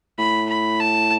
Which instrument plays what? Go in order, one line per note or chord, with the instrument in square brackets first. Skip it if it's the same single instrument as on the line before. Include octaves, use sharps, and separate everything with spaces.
[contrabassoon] A2 [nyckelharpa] B5
[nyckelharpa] B5
A5